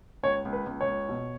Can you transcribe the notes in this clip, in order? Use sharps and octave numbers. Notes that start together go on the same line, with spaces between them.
C#2 C#5
C#2
B4
C#2
C#5
C#2
B2